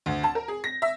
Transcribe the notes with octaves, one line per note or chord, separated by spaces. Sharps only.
D2
A5
A#4
G#4
A#6
E5